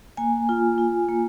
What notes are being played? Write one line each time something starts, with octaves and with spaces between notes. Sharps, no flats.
A#3 G#5
F4
F4
A#3